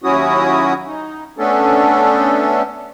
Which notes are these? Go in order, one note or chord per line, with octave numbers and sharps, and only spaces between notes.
D#2 F#3 C#4 E4 F#4 D#6
D#4
A3 B3 C#4 D4 A4